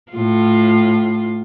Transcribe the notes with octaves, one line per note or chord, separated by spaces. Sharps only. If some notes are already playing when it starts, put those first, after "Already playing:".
A2 F4